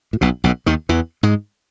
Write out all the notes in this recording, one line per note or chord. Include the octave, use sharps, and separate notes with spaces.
A2
B1 B2
B1 B2
D#2 D#3
E2 E3
G#2 G#3